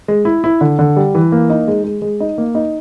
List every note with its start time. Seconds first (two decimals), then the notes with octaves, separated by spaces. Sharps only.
0.08 G#3
0.25 E4
0.44 E4
0.61 D3
0.79 D3
0.96 G3
1.15 E3
1.32 A#3
1.50 D#4
1.68 G#3
1.84 G#3
2.02 G#3
2.20 D#4
2.38 A#3
2.55 D#4